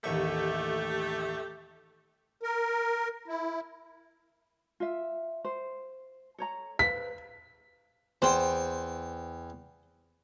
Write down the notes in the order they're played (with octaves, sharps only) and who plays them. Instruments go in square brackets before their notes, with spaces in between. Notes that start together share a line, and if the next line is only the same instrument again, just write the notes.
[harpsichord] A1 D#2 C#6 [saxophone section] A3 G4
[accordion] A#4
E4
[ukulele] F4 E5
C5
A4 C#5 A#5
[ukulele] B4 C5 F5 [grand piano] B6
[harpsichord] E2 G5 [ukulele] C5